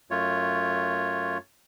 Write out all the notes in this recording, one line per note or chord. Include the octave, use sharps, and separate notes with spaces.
F#2 A3 F4 C#5